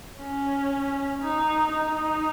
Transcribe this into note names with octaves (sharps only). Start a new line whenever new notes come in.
C#4
D#4
D#4